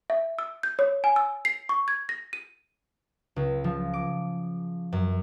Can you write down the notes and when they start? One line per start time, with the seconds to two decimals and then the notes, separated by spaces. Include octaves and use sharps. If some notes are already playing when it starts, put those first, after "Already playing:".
0.10 E5
0.39 E6
0.63 G6
0.79 C#5
1.04 G#5
1.16 E6
1.45 C7
1.69 C#6
1.88 G#6
2.09 A#6
2.33 D#7
3.36 C#2
3.64 F3
3.94 D6
4.92 F#2